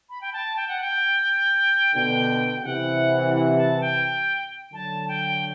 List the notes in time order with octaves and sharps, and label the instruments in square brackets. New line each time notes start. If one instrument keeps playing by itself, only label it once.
[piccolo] B5
G5
A5
G5
F#5
G5
[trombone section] B2 D3 [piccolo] G5
[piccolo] G5
[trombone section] C3 E3 [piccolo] F#5
[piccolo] F#5
A5
G5
[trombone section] D3 F#3 [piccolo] A5
[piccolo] G5